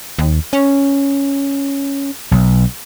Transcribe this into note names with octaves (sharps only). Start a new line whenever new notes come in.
D#2
C#4
B1